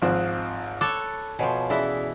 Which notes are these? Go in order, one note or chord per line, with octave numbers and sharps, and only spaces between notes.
G#1 F3 C4 F5 D#6 F#6
A4 C#5 A5 B5 D6 F#6
B2 F3 C#5 G#5
E3 C#4 E4 G#4 D5